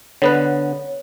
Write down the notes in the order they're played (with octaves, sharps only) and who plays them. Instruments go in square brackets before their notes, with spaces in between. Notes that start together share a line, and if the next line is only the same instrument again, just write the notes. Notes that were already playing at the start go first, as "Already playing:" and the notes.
[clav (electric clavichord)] D3 B3 B4 [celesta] C#5